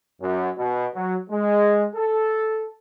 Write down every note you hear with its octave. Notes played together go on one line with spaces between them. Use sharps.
F#2
B2
F#3
G#3
A4